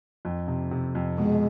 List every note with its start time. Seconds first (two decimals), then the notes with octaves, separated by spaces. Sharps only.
0.25 F2
0.47 C3
0.71 C3
0.95 F2
1.18 B2 G#3